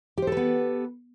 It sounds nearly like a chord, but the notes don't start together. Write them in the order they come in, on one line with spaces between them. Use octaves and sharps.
G4 C5 A4 B4 B3